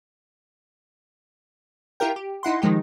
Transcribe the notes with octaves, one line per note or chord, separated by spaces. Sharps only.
E4 F4 G4 A#4 G5
G4
D#4 E4 F#5 C6
D#3 F3 G#3 D#4 G4